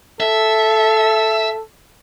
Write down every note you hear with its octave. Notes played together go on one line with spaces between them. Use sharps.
A4 E5